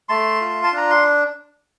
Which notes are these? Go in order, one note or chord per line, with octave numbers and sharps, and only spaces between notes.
A3 A5 C6
F4
A5
D4 A#5
C6